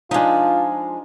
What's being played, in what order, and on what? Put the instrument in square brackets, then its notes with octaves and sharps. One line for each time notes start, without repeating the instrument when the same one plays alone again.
[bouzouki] F3 G#3 [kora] D4 D#4 [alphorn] F4